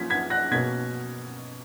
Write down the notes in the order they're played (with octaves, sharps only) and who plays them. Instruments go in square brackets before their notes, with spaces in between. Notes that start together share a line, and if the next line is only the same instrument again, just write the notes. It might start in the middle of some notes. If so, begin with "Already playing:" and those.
Already playing: [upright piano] F3 A#3 C#4 G#6 B6
G#6 B6
F#6 A#6
B2 A#3 C#4 G#6 B6